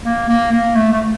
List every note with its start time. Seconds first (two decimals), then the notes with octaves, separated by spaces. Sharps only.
0.05 A#3
0.29 A#3
0.52 A#3
0.75 A3
0.93 A3